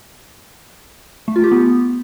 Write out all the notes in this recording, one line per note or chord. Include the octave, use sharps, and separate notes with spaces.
A3
F4
G4
B3